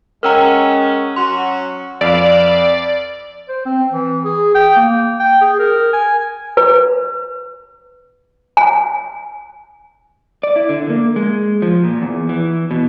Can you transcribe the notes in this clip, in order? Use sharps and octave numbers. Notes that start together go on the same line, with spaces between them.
G#3 C#4 A#4 F#5 G5 A#5 E6 F6
F#3 C#4 F#4 C6
F2 B4 D5 E5 F5
C5
C4
E3
G#4
G5
A#3
G5
G#4
A#4
G#5
B4
G#5
D5
E4
D3
A#3
G#3
F3
A#2
E2
E3
B2